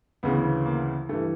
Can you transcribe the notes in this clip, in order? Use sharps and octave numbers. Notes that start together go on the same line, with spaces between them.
D2 C#3 E3 B3
A#3
G2 E3 A3